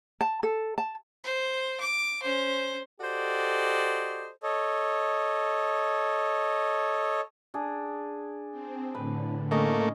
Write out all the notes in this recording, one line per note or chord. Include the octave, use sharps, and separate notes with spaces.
A5
A4
A5
C5
D6
C#4 C5
F#4 G4 A4 C5 D5 D#5
A4 C#5 D#5
D4 G#4
C4
A2 D3 B4
A3 A#3 C#4 D#5 C#6